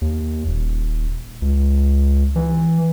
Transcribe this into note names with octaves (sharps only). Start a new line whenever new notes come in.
D#2
D#1
C#2
E3